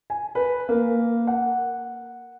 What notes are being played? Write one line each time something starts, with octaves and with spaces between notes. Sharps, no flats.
G#5
B4
A#3
F#5